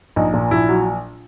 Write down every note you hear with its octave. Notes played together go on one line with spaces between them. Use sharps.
A#1 D#4
A#2
A#1 E4
F#3